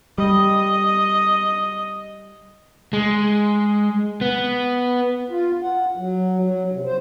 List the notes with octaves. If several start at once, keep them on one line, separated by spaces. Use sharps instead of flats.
G3 D#5
G#3
B3
F4
F#5
F#3
F#3
C3
C5